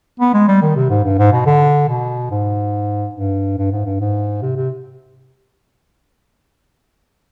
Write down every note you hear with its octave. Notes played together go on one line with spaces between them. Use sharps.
B3
G#3
G3
D#3
C3
G#2
G2
G#2
B2
D3
B2
G#2
G2
G2
G#2
G2
G#2
C3
C3